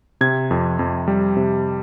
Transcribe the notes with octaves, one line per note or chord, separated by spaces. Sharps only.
C3 G#6
F2
F2
G3
C3